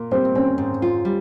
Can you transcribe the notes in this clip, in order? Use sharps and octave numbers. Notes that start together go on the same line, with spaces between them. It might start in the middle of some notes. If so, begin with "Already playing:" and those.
Already playing: A#2 A#3
G3 C4
C4 C#4
G#2
F4
G3